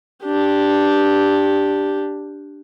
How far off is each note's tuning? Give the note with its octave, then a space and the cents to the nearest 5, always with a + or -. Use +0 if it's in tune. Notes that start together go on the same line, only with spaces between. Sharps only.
D4 +0 G4 +0